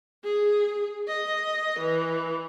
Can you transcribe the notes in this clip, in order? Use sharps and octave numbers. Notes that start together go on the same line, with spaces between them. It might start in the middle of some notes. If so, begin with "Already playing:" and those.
G#4
D#5
E3